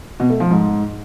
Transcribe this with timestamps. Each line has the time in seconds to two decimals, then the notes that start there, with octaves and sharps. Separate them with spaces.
0.20 B2
0.30 A3
0.40 F3
0.50 G#2